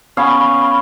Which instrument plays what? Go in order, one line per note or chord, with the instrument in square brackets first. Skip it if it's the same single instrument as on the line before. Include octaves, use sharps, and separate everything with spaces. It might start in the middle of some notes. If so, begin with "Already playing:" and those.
[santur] B3 C#4 F5 [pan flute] B5
[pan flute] B5